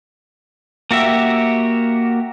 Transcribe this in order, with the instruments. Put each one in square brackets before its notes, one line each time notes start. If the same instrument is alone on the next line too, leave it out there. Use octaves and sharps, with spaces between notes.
[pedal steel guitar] A#3 F#4 G4 E5